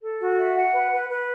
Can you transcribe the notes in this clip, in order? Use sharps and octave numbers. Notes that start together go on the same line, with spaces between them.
A4
F#4
E5
F#5
B4
B4
B4